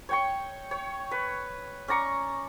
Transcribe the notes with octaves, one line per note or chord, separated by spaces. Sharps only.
C#5 G5 C#6
C#5
B4
C#4 D5 A#5 C#6